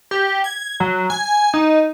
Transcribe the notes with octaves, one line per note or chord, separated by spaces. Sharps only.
G4
G#6
F#3
G#5
D#4